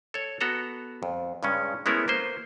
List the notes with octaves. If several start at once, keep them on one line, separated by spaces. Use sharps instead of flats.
A4 C#5
B3 F#4 A4 A#5
F2
G2 C#3 G#3 C#4
G#3 A3 B3 C#4 E4 A#4
A#3 B4 C5